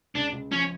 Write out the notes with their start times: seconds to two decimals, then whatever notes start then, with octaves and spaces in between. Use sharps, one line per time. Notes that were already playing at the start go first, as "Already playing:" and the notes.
0.15 C#2 D4
0.33 C#2
0.51 F3 C#4